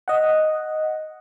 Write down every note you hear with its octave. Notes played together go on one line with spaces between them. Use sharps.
D#5 F#5